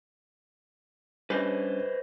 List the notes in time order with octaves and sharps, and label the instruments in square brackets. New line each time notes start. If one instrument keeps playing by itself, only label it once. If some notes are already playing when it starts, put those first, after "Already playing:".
[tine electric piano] G3 C#4 D4 [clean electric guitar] B4 C5 D#5